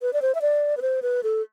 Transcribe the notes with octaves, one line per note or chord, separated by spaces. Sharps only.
B4
D5
C5
E5
D5
B4
C5
B4
A4